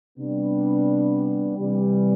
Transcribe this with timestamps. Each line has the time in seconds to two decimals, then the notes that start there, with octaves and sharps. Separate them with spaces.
0.17 C3 G3 B3 D4
1.57 C3 E3 G3